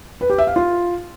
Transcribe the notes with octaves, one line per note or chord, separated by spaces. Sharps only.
B4
G4
E5
F5
F4